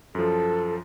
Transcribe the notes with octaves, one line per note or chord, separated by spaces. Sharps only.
F#2 F3 A4